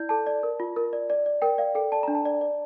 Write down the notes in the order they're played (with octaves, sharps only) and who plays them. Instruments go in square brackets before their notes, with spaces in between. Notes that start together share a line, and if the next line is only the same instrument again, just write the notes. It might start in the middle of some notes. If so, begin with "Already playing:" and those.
Already playing: [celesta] E4 D5 G6
A4 A5
D5
A#4
F4
A#4
D5
D5
D5
A#4 G5
D5 F5
A4 G5
D5 A5
D4 A#5
A5
D5
D5